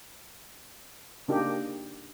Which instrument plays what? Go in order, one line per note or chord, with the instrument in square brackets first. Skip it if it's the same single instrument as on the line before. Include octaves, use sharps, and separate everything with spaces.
[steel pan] C#3 A#3 D4 D#4 G4